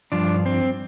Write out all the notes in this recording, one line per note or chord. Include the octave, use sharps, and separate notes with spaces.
G2 F3 D4
C4